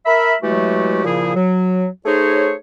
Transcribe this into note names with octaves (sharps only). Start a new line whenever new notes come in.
A#4 E5 B5
E3 F#3 G#3 A3 F#4 G4
A#2 C#3 F3 E4 G#4
F#3
A3 D#4 G#4 C5 C#5